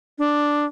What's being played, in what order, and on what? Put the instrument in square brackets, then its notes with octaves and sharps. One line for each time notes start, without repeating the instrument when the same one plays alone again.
[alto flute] D4